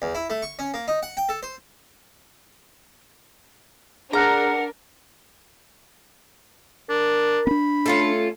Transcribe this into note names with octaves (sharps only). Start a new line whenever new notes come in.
E2
E4
A3
C#6
C#4
A#3
D#4
F#5
G5
A4
C5
D4 G#4 A#4 F#5 A#5 F6 F#6
D4 A#4
C4 D4 B5
A3 C#4 F4 A4